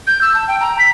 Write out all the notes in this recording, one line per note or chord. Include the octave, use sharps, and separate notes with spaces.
G6
E6
A5
G5
A#5
B6